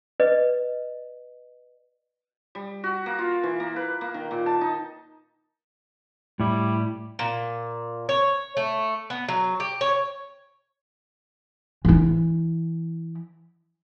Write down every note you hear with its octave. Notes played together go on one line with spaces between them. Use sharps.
B4 D5 D#5
G3
F#4
A#3
F4
E3
A#3
B4
A#3
D#3
A#2
A5
D#4
A2 G3 E4
A#2
C#5
A3
B3
F#3
G4
C#5
E3 E4